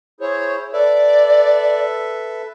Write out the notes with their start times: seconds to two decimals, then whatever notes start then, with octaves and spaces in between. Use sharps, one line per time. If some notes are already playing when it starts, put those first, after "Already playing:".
0.21 E4 G#4 C5 C#5
0.73 A4 B4 D5 E5